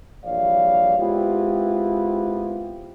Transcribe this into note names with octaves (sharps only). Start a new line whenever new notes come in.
A#1 E3 G3 C#5 D5 F5
G#3 B3 C4 E4 F4 G4